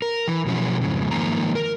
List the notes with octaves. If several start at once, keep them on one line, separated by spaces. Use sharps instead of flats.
A#4
E3
B2 F3 F#3 C#4 E4
F2 G#2 C#3
G#2 D#3 F3 A#3 A#5
A#4